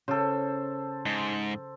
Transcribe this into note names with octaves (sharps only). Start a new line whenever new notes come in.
C#3 A4 C5
G#2